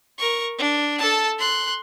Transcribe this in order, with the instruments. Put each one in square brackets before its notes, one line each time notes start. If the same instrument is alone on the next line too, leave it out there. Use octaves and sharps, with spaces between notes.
[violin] A#4 C#6
D4
A4 A5
C6 F#6